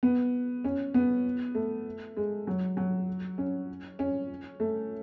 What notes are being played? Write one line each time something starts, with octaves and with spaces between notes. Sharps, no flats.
B3
C#4
B3
A3
G#3
F#3
F#3
C#4
C#4
A3